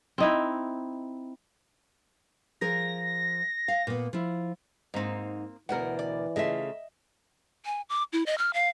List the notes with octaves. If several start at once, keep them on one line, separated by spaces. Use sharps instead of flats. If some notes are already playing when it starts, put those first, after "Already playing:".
C4 D#4 E4
F3 G#4 A#4 A#6
F5
A#2 B3
F3 E4
G#2 A#3 C4 D#4
D2 B2 E3 A#4 F#5
D5
C#3 A3 F4 D#5 E5
G#5
D6
E4
D#5
F6
F5